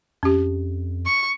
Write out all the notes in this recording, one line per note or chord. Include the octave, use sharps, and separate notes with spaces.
F2 C#4 G4
C#6